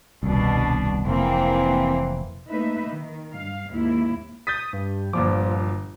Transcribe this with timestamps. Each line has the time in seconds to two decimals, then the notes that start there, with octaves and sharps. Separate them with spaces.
0.23 D#1 C2 B2 D4
1.05 F1 E3 A#3 C4
2.50 A3 A#3 D#4 B4 E5
2.89 D#3
3.33 G2 F5
3.70 D#2 G#2 A#3 E4
4.47 D#6 G6 A6 B6
4.73 G2
5.13 G1 A#2 F3 D6